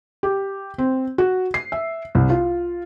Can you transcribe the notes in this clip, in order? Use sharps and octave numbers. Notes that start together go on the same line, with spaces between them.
G4
C4
F#4
C7
E5
C2
F4